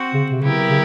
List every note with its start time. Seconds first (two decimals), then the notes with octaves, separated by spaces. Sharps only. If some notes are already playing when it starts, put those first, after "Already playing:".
Already playing: C4 F#4
0.14 C#3
0.31 C3
0.42 C#3 F#3 B3 E4 G4 A#4
0.70 C#3